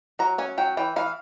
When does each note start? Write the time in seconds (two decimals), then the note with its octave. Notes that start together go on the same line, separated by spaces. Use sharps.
0.19 F#3 A#5
0.38 C#4 G#5
0.58 F#3 G5
0.77 E3 G5
0.96 E3 F5